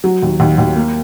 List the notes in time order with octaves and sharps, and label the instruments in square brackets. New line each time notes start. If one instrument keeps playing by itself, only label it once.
[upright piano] F#3
D#2
D#2
D#2
A#3